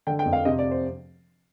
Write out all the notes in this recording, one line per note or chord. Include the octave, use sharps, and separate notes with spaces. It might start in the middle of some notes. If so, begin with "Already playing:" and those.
D3 G5
G5
F2
F5
C3 D#5
D5
C5